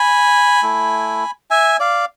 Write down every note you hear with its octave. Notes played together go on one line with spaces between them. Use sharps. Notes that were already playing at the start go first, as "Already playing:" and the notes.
Already playing: G#5 B5
A3 E4
E5 G#5
D5 F5